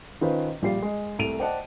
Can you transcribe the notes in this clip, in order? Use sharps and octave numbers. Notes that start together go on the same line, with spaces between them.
D#3 C#4 F4 B4 C5
A#1 G3 F4 D5 C7
G#3
C2 A3 D7 D#7 F7
C5 D5 D#5 F#5 G5 A5